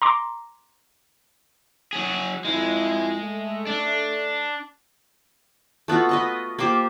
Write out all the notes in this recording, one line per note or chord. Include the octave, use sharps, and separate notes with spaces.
A#5 C6 D6
F#3 G#4
F2 G#3 E4
A3
D4
A3 B3 F4 F#4
B4 D#5 C#6
A#3 F4 G4 C5